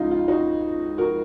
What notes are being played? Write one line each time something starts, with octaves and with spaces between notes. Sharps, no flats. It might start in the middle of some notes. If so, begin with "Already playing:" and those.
Already playing: C#2 C#3 D#4 F4
F4
D#4 F#4
F#4 A#4